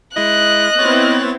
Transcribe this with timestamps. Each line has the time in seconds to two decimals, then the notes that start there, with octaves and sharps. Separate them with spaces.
0.16 G#3 E4 D#5 F#6
0.79 B3 C4 E4 C#5 A6